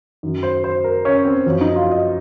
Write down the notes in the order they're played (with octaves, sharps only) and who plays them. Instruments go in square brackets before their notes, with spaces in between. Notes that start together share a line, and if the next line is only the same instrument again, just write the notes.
[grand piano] F#2 D#3
C5
C5
A#4
C#4
C4
F#2 F3 C#4
D#4
F4
D#5